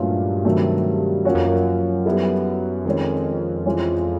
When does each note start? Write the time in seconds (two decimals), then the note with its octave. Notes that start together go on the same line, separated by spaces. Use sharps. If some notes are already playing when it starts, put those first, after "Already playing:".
Already playing: G2 A#2 F#3 A3 C#4 F4
0.45 C3 D#3 F#3 A3
1.25 F#2 F3 A#3 C#4 F#4
1.35 F2
1.45 F#2
2.06 G3 B3 E4 A4
2.85 F2 D#3 G#3 C#4
3.66 E3 G#3 C#4 F4